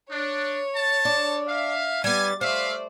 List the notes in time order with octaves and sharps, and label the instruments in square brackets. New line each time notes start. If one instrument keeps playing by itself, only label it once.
[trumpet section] D4 [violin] C#5
[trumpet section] A5
[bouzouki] D4
[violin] E5 [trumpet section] F5
[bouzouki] G3 B3 [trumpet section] G#5 [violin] A6
[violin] A3 D5 [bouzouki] C5 [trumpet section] E5 F5